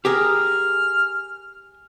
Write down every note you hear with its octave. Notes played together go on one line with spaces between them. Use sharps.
G4 G#4 A#4 F6